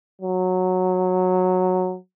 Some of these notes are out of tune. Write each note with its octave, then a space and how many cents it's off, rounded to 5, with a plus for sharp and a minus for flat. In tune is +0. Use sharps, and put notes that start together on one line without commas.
F#3 -10